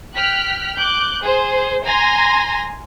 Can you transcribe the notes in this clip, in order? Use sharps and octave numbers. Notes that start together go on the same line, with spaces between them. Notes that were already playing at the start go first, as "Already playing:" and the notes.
G5 F6 F#6 B6
D6 F#6 G6
G#4 C5
G#5 A#5 C6 A#6